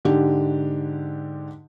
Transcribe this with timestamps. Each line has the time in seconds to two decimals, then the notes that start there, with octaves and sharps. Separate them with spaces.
0.05 G#2 D3 G4